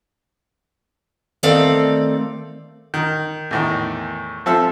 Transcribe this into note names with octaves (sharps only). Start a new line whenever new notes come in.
D#3 A3 C4 A4 D5 F5
D#3
E2 A2 D#3
F3 C4 A4 E5 A5 F6